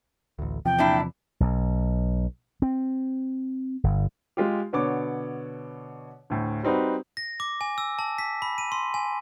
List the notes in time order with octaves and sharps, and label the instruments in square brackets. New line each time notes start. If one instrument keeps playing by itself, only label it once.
[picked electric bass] A1 D2
[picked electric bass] E2 C3 F3 [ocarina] G5
[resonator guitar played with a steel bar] A#2 D4 E4
[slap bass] B1
C4
G1
[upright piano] G#3 F4 G4
B2 D3 B3 C#5 D6
D2 A2
G3 C4 D#4 F#4 B4
[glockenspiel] A#6
D6
G#5
E6
A5
B6
B5
D#7
C6
G#5